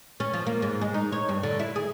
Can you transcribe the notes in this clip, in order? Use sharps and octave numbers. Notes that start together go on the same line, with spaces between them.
C#4
F3
A#3
G#2
G#3
D#4
C#5
G2
D3
E4
G#4